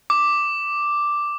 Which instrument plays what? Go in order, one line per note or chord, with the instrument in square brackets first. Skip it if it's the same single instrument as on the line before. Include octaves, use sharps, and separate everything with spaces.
[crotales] D6